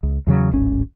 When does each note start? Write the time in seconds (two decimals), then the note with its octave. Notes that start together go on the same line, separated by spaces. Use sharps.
0.03 C#2
0.27 E2 C#3 F#3
0.51 D1 G#1 C#4